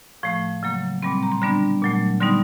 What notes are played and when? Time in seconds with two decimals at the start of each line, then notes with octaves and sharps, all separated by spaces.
0.23 A2 F3 A3
0.63 C#3 F#3 A#3
1.02 A#2 G3 C4 B5
1.23 A#5
1.32 C6
1.42 D3 G3 B3 D4 B5
1.82 A#2 F#3 A3
2.21 D3 G3 B3 D#4 C6